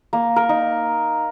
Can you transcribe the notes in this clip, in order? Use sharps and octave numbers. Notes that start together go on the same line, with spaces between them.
A#3
A#4
D#4